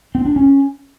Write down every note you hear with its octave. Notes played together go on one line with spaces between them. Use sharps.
C4
D4
C#4